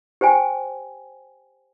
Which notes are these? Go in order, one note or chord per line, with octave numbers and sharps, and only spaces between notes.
G4 C5 G5 G#5